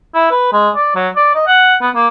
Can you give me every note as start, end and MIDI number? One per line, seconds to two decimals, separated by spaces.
0.14 0.28 64
0.31 0.48 71
0.53 0.70 56
0.76 0.94 74
0.95 1.09 54
1.16 1.31 74
1.35 1.44 75
1.47 1.76 78
1.82 1.90 59
1.95 2.08 58